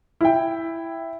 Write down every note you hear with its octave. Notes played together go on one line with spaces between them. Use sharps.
E4 G5